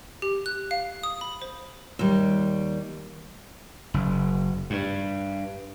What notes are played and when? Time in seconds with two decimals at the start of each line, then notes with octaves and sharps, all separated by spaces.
0.22 G4
0.46 F#6
0.71 F5
1.03 D#6
1.21 B5
1.42 C5
1.99 D#2 G3
3.94 F#1
4.70 G2